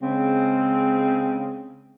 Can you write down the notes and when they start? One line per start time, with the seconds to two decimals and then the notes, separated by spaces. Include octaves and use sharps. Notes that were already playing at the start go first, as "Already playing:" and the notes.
0.02 C#3 G#3 C4